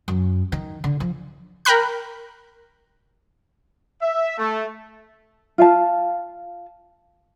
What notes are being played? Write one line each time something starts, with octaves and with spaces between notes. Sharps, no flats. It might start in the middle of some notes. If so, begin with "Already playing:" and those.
F#2
D#3
D3
F3
A#4 G5 B5 F#6
E5
A3
F4 F5 A5